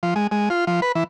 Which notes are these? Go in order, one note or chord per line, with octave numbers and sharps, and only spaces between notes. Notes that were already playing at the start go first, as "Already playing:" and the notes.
F3
G#3
G#3
F4
F3
B4
E3